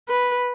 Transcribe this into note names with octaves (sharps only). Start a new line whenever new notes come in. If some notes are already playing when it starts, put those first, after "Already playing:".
B4